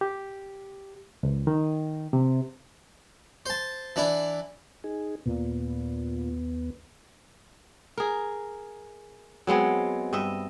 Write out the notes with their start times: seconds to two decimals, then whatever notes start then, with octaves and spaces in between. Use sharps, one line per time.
0.01 G4
1.23 C#2
1.47 D#3
2.13 C3
3.46 C5 A5
3.96 E3 D4 E4
4.84 D#4 G#4
5.26 D#2 A#2 B3
7.98 G#4 A#4
9.47 F#3 G#3 B3 C4
10.13 G2 D#5 E5